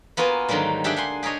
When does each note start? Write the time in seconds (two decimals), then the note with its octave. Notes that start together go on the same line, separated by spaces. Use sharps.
0.17 A#3 B3 F4 F#4 G#5
0.48 G#2 D3 D#3 F#3 G3 A#3
0.84 D4 G4 G#4 E5 F#5 G5
0.96 F#5 G#5 C6
1.23 G4 G#4 A#4 C#5 D#5